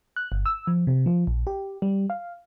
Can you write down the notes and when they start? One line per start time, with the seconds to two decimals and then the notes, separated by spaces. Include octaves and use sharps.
0.16 F#6
0.32 G1
0.46 E6
0.67 F3
0.87 C3
1.06 F3
1.27 A#1
1.47 G4
1.82 G3
2.10 F5